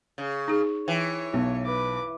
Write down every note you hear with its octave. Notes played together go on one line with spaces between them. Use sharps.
C#3
D#4 G#4
E3 C#5 G5
B1
B4 D6